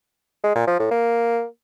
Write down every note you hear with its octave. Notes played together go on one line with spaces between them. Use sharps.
G#3
A#2
F3
A2
A#3